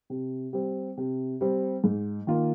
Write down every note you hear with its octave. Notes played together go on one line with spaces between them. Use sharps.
C3
G3 C4
C3
G3 C4
G#2
D#3 A#3 F4